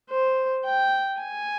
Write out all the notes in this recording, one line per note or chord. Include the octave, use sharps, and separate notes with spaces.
C5
G5
G#5